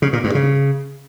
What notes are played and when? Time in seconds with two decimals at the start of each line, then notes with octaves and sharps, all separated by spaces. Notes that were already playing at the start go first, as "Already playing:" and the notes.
0.02 C#3
0.13 A#2
0.24 G2
0.35 C#3